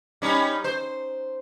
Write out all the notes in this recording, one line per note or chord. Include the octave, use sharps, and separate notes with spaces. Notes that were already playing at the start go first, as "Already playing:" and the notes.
G3 C#4 D#4
C5